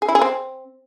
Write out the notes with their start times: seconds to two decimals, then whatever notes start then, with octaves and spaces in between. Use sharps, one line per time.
0.02 G#4
0.08 E4
0.15 G#4
0.22 C4